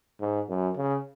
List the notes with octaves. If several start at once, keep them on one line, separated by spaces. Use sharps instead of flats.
G#2
F#2
C#3